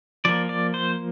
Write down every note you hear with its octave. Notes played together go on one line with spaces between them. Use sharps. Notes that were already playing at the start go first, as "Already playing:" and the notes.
F3 A#3 D5
D5
C5